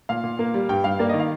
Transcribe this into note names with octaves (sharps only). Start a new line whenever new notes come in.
A#2 F5
A#2
A#3
G3
G2 G5
G2 F5
A#3 D5
D#3 D#5
F5